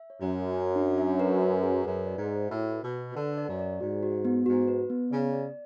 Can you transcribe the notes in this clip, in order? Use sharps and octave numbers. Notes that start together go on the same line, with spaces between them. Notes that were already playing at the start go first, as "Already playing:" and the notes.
Already playing: E5
C#5
F#2
C#5
C#5
D4
E5
B4
B4
G#4
F#2 B4
D5
G#2
G#4
A2 F#4
B4
B2
B4
D3 B4
D5
F#2
D5
G#2 F#4
F#4
B3
G#2 F#4
B4
B3
C#3 D5
D5